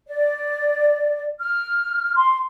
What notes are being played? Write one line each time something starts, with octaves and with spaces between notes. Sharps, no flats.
D5
F6
C6